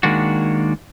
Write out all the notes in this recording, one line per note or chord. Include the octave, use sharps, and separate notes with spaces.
D#3 G#3 A#3 D4 F#4